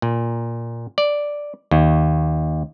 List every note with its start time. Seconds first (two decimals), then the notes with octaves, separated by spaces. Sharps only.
0.02 A#2
0.98 D5
1.71 D#2